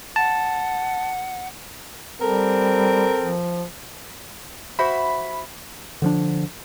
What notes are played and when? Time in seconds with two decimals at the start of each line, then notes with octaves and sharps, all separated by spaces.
0.16 F#5 A5
2.21 G3 C4 A4 A#4
3.21 F3
4.79 F#4 C5 E5 B5
6.02 D3 F3 D4